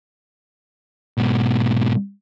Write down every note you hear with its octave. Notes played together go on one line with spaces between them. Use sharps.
G#2 B2